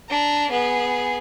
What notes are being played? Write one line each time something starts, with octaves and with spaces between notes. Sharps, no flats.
D4 A#5
B3 G#4